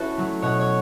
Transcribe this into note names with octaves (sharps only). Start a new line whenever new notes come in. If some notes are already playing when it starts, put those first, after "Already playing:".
Already playing: C#4 E4 F#4 A4 B4
F#3 A3
B2 C#5 F#5
C#5